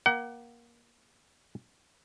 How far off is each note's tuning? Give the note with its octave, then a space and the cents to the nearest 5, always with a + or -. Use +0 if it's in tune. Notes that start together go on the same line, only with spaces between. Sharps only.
A#3 +20 F#5 +35